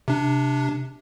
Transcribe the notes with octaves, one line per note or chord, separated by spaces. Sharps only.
C3 D4